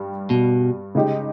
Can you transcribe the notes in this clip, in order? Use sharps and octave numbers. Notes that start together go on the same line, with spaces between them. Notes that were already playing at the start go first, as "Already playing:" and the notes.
Already playing: G2 G3
B2
C#3 G#3 D#4 G4